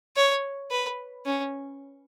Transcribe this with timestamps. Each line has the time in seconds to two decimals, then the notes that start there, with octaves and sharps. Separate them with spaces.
0.17 C#5
0.71 B4
1.26 C#4